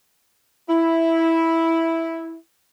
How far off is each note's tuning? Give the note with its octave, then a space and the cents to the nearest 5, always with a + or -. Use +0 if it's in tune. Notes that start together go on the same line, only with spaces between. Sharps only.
E4 -5